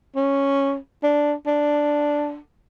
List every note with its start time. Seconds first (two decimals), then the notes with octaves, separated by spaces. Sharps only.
0.16 C#4
1.03 D4
1.47 D4